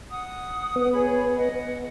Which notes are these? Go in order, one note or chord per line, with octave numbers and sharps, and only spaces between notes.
F#5 D#6
B3
G#4 C#5 B5
D#5 F#5